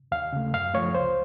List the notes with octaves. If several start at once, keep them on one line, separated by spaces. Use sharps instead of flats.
D#2 F5
C#3 A3
F#2 F5
F3 A3 C#5
C#2 C5